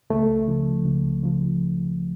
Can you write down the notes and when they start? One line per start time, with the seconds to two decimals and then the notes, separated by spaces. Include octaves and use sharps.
0.10 C#2 A3
0.48 C#3 F3
0.85 C#2
1.23 C#3 F3